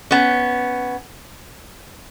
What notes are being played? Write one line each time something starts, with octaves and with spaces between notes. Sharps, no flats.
B3 C#4